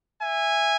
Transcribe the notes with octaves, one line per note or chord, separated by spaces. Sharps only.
E5 G#5